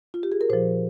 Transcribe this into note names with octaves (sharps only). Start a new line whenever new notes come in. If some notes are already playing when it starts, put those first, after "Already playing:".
F4
G4
G#4
A#4
A#2 F3 C5